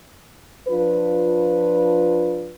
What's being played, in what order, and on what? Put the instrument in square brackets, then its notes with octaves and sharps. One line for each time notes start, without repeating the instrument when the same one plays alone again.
[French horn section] F3 D4 F4 B4